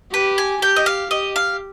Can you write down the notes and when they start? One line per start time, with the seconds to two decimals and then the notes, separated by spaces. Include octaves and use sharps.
0.14 G4 B4
0.38 G#5
0.62 G4 G5
0.76 D#5
0.86 F5
1.11 G4 D#5
1.36 F5